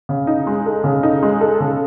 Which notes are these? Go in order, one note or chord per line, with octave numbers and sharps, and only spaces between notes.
C#3
D#4
G#3
A4
C#3
D#4
G#3
A4
C#3